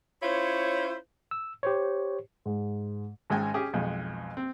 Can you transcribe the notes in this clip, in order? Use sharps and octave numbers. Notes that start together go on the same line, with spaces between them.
C#4 E4 F4 C5 C#5
E6
G4 C5 C#5
G#2
G#1 G#2 G#3 C#4 G5 G#5
C#4 G4 G#4
B1 F2 G#3
C4